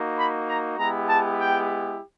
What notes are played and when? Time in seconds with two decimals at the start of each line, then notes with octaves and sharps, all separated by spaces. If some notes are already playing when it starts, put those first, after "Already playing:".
Already playing: A#3 D#4 F#4
0.17 B5
0.48 A#5
0.79 G#3 B3 E4 G4 A#5
1.08 A5
1.40 G5